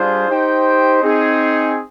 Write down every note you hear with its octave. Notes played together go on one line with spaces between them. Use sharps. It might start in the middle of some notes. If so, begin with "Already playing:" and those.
Already playing: G3 D4 F4 G#4 C5
D#4 G4 C5 G5
C4 D#4 G#4